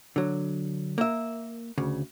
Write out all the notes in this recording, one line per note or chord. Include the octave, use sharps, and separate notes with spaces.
D3 F#3
A#3 A#4 E5
D2 C#3